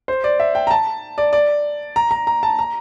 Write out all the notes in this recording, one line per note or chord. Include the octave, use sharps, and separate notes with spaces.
C5
D5
E5
G5
A#5
A5
D5
D5
A#5
A#5
A#5
A5
A#5